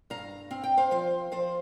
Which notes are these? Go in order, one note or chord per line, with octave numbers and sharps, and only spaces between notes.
G2 F5 A#5
C4 F5
G5
C5 F5
F3 C5 F5
F3 C5 F5